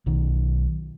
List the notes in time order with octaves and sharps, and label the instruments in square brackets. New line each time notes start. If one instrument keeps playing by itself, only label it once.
[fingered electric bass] B1 D#3